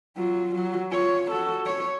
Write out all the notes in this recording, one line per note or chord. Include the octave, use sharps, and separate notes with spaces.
F#3 F4
F#3
F4 C#5
F#4 A4
C#5